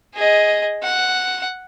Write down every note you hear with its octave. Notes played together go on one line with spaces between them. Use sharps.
G#4 D#5
F#5